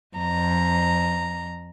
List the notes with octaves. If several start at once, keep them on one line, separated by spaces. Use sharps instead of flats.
F2 A#5